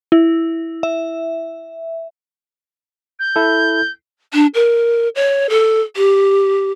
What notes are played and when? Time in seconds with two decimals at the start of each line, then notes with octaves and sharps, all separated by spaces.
0.12 E4
0.83 E5
3.19 G6
3.36 E4 A4
4.33 D4
4.54 A#4
5.15 C#5
5.50 A4
5.96 G4